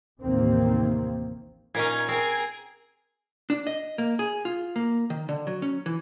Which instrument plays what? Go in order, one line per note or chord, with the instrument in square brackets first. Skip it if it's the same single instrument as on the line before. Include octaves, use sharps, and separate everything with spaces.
[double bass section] A1 D#2 C3 D#3 A#3 C4
[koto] A#2 C#4 [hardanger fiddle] D#4 A#4 [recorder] G#6
[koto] C4 [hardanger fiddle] G#4 A#4
[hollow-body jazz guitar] D4
D#5
A#3
G#4
F4
A#3
D#3
D3
F#3
C#4
E3